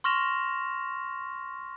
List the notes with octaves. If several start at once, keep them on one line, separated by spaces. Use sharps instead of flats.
C6 C#6 F6 A#6 E7 F7